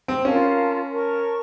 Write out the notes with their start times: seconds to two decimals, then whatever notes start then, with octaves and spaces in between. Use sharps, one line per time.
0.08 C4
0.25 C#4 F4 A#4 F5 A5
0.93 A#4 C#5 A5 C#6